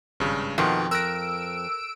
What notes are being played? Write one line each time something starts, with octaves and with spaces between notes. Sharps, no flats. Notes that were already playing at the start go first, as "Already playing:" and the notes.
G#1 G2 C#3
F2 B2 D#3 B3
A#4 E6 F#6 A#6 D7